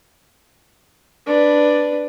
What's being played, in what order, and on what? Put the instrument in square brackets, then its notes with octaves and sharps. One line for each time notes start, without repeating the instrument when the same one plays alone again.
[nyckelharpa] D4 B4